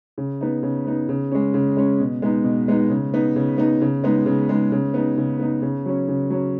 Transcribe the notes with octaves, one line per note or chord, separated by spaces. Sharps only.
C#3
B3 D#4
C#3
B3 D#4
C#3
G#3 C#4
C#3
G#3 C#4
B2
G#3 B3 D#4
B2
G#3 B3 D#4
C#3
B3 D#4
C#3
B3 D#4
C#3
G#3 B3 D#4
C#3
G#3 B3 D#4
C#3
B3 D#4
C#3
B3 D#4
C#3
F#3 C#4
C#3
F#3 C#4